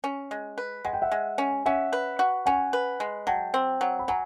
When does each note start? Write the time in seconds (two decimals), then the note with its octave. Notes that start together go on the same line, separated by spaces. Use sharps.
0.04 C#4
0.31 G#3
0.58 B4
0.85 G#3 F#5
0.93 G5
1.02 E5 F#5
1.11 G#3
1.38 C#4
1.66 C#4 E5 F#5
1.93 B4
2.19 F#4
2.46 C#4 F#5 G#5
2.73 B4
3.00 G#3
3.27 F#3 G5 A5
3.54 C4
3.81 F#3
3.99 B5
4.08 F#3 G#5 A#5